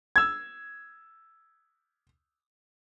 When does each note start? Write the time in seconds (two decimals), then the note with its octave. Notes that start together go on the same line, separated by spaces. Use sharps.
0.16 E6 G#6